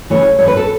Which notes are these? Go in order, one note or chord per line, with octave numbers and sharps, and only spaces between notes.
C#3 E3 A3 C#5
A2 E3 A3 C#5
B4
A4